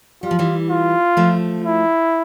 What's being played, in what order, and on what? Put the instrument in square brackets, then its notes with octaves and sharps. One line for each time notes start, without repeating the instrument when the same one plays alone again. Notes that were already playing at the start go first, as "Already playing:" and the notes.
[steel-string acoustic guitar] G3 [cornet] F4
[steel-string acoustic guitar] F3
E3 G3
[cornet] F4
[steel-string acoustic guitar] F3 A3
[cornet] E4